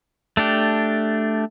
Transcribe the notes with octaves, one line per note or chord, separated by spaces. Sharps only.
A3 D4 G4